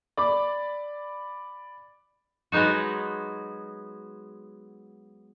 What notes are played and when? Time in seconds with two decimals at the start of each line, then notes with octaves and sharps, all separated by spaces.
0.17 D5 B5 D6
2.52 F#3 G#3 B3 D#4 F#4